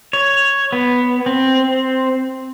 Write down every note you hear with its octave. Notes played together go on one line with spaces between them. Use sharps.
C#5
B3
C4